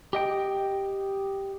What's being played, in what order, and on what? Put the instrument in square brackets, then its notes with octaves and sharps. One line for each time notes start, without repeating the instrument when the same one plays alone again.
[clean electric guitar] G4 D#5 G5